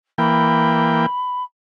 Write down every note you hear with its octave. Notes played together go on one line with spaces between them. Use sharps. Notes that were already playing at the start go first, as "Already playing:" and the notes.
E3 A#3 G5 B5